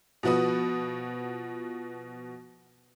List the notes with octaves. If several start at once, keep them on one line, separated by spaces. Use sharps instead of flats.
B2 F3 F#4 B4 D#6